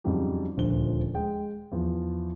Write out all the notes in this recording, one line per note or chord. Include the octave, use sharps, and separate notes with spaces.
F2 C#3 F#3 G3 D#4 G4
D#1 D2 D3 F3 C5 G7
G#3 G5
E2 F3